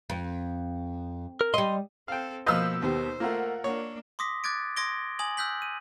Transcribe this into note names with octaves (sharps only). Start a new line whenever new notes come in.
F2
A#4
G3 D#5 C6
C4 A4 F5 G5
B2 F3 A#3 B4 D#5 F5 E6 G6
D#2 B3 G4 C5
A3 A#3 F4 A#4 F#5
A#3 D4 C#5
C6 D6 D#6 A#6 B6
D6 F#6 G#6 A6 D7
C6 D#6 G#6 A#6 D7 G7
G#5 D#6 G#6 F#7
E6 F#6 G6 B6 F#7
D#7